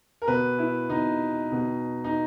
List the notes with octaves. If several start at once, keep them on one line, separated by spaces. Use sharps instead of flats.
A#4
B2 B4
E4
B2 D#4
B2
D#4